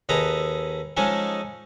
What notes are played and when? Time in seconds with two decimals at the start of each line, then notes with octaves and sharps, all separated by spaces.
0.09 D#2 G#4 A4 B4 D#5 A#5
0.97 F3 G#3 C#4 D#4 G#4 A4